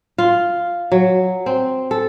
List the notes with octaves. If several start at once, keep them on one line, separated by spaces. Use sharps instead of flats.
F4
F#3
C4
A4